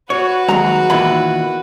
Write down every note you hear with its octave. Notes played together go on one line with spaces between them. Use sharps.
F#4 B4 C#5
D#2 F#3 G#3 A#5
E2 A#2 D#3 E4 B5